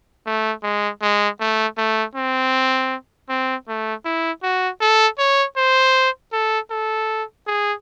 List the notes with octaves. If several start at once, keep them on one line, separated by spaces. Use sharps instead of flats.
A3
G#3
G#3
A3
A3
C4
C4
A3
E4
F#4
A4
C#5
C5
A4
A4
G#4